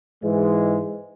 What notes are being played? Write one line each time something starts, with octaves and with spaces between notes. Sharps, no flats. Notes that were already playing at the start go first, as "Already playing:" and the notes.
G#2 E3 G#3